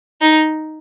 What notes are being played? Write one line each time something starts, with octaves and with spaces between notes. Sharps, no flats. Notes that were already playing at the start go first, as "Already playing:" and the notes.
D#4